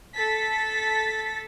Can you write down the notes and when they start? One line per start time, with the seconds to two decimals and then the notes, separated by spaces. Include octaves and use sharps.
0.16 A4 A6 B6